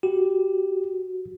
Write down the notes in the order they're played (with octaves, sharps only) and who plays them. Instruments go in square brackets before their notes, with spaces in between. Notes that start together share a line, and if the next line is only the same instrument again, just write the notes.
[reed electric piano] F#4 [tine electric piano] G4